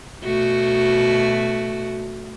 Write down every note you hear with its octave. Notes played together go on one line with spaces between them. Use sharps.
B2 A3 F#4